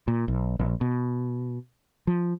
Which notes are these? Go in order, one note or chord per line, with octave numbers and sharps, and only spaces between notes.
A#2
B1
A#1
B2
F3